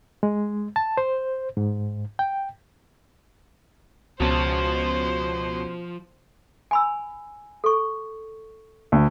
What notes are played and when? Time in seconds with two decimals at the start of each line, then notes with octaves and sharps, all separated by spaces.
0.23 G#3
0.76 A5
0.97 C5
1.57 G#2
2.19 G5
4.20 C#2 B2 F3 C#4 C5 A5
6.71 G#5 B5 E6
7.64 A4 C#6
8.92 D2